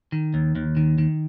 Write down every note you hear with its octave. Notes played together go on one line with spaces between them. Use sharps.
D#3
D#2
D#2
D#3
D#3